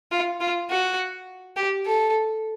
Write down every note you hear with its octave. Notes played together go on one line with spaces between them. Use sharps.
F4
F4
F#4
G4
A4